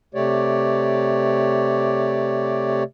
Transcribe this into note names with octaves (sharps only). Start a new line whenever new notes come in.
C3 A3 G4 C#5 D5